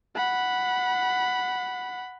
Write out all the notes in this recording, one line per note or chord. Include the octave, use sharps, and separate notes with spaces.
F#5 B5